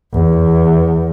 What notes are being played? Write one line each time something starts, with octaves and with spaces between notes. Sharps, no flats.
E2